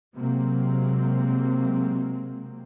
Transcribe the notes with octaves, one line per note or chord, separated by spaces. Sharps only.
C3 F#3 G#3 A#3 C4